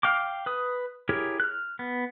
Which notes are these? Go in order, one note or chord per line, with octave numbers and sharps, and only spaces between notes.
F5 G5 D6
B4 D#6
E4 G4 G#4 A#4 C#5
F6 F#6
B3